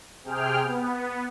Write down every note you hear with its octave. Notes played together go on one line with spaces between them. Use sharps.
C3 G#4 G5 F6
B3